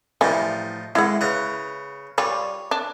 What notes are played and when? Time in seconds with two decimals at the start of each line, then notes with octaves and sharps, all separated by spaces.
0.21 A2 E3 F3 G3 D#4
0.95 D#3 G#3 E4 F#5
1.21 C#3 B4 A#5
2.18 G3 F4 C#5
2.71 D4